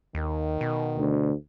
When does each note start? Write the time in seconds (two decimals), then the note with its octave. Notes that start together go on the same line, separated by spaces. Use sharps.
0.15 D#2 D#3
0.61 B2
0.98 D2